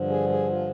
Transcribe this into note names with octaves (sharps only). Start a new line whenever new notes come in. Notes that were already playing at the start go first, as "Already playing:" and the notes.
Already playing: G2 D3 F3
G#4
G#4
F4